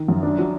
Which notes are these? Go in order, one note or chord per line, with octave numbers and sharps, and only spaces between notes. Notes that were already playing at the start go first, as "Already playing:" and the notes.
Already playing: D#3
F#2
D4
F#3